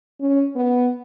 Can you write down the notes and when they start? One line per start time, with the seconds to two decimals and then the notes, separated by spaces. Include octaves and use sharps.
0.20 C#4
0.56 B3